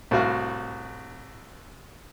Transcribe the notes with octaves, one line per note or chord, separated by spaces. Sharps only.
C2 A2 F#4 F5